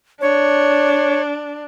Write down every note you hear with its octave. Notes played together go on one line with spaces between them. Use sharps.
D4 C#5